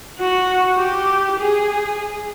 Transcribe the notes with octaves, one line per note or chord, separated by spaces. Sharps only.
F#4
G4
G#4